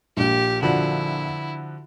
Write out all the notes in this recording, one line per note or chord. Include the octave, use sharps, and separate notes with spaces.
A#1 A#2 G4
D3 F3 E4 F#4